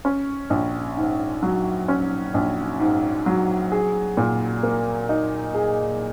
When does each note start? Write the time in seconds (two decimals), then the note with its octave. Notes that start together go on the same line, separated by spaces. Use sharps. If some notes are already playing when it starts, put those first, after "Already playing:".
0.05 C#4
0.50 A#1
0.97 G#2
1.43 F#3
1.88 C#4
2.34 A#1
2.79 G#2
3.26 F#3
3.72 G#4
4.17 A#2
4.63 A#3
5.09 D#4
5.55 G#4